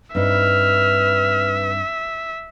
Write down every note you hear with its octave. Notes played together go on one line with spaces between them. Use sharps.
G2 C4 D#4 B4 E5 F6